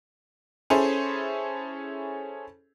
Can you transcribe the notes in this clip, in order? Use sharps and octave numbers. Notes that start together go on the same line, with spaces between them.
C#4 E4 G#4 A4 C5